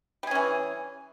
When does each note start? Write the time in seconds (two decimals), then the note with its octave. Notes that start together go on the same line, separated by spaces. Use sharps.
0.23 G3
0.27 G#4
0.31 C#4
0.35 E3